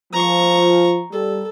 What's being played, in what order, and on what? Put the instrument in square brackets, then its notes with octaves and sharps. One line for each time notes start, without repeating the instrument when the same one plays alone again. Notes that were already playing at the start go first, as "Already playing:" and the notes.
[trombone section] F3 [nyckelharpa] A#5 C#6
[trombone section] G3 [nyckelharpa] A4